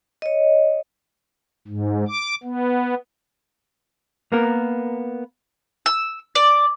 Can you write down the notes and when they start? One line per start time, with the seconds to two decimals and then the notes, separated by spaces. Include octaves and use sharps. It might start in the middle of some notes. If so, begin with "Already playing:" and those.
0.22 C#5 D#5
1.67 G#2
2.08 D6
2.43 B3
4.32 A#3 B3 A#4
5.86 E6
6.35 D5